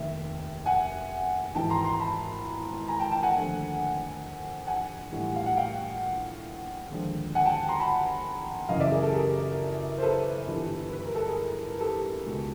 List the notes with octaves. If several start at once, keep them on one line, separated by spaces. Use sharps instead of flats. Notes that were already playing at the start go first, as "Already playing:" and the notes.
Already playing: F1 D#2 D#3 E5
F#5 G#5
G#1 G#2 E3 G#3 G5 A5
A#5 C6
A#5 C6
A5 B5
G#5 A#5
G5 A5
G5 A5
F#5 G#5
D#2 D3 F3 A3
F#5 G#5
A#1 A2 E3 G3
F5
F#5
F5 G5
D#2 D3 F3 G#3
F#5 G#5
G5 A5
A#5 C6
A5 B5
F#2 C#3 E3 D#5 F5
D5 E5
G#4 A#4
G4 A4
G#4 A#4
C5
A4 B4
G1 G2 E3 G3
B4
A#4
A4
G#4 A#4
G4 A4
C#2 B2 G#3